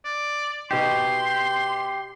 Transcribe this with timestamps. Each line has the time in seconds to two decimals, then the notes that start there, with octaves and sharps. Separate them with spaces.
0.05 D5
0.71 B2 D#4 G4 C6